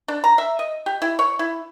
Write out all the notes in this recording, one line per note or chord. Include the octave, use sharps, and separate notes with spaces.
D4
A#5
E5
D#5
G4
E4
C#5
E4